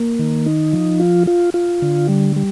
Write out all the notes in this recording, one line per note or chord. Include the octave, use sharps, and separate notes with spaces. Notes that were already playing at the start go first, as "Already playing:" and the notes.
Already playing: A#3
D#3
D#4
F3
F4
F4
F4
D3
G3
G3